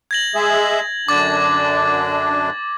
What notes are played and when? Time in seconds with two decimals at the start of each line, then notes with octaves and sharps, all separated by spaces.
0.11 G#6 A#6 F#7
0.35 G#3 G#4 E5
1.08 F#2 D3 D4 D6 A6